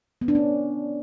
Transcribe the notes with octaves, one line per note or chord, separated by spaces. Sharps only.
B3
D4
C#4